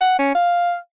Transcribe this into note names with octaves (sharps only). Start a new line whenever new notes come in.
F#5
C#4
F5